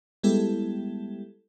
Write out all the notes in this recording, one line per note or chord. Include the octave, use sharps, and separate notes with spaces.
G3 G#3 B3 E4 G4 A4